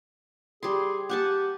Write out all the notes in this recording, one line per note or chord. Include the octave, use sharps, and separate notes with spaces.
G3 G#4 C6
G4 F#5 G#5 A5